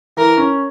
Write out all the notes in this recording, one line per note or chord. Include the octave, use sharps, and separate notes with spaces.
E3 A#4
C#4